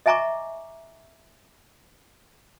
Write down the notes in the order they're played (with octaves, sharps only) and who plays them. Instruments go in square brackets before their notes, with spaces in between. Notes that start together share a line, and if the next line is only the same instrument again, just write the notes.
[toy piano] D#5 E5 G#5 A#5 C#6 D6